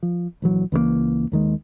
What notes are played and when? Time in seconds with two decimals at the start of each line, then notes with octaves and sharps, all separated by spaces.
0.03 F3
0.42 A#1 E3 F#3
0.72 C#2 E3 F#3 A#3
1.32 D#2 D#3 G#3